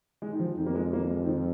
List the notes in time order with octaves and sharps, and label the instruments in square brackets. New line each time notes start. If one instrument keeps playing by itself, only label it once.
[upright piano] G#3
D#3
F3
[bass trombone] F2 [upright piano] D#3
[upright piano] A#3
G#3
A#3
G#3
D#3
F3